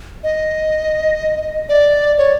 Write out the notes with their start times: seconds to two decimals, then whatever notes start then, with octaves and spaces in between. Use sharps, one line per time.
0.24 D#5
1.69 D5
2.18 C#5